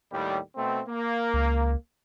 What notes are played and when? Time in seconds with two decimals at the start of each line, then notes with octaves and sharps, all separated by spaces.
0.11 D#2 A2 G3
0.55 B2 A3 C4
0.87 A#3
1.34 C#2